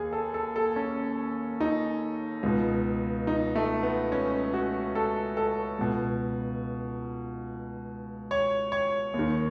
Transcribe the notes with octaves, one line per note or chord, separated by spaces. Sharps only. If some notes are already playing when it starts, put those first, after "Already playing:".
Already playing: D#2 G#4
A4
A4
A4
C#4
D#4
C#2 B2
D#4
A3
B3
C#4
F#4
A4
A4
C#2 B2
C#5
C#5
D#2
D#3